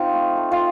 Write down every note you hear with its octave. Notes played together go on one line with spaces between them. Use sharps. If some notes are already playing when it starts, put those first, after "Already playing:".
Already playing: C4 D#4 F4
A3
A3
F4